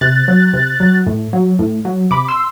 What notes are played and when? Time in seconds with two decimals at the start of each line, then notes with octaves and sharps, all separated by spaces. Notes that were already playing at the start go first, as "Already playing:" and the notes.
0.01 C3 F#6 A6
0.28 F#3
0.53 C3
0.80 F#3
1.06 A2
1.33 F#3
1.59 A2
1.85 F#3
2.11 C3 B5 D6
2.28 C6 E6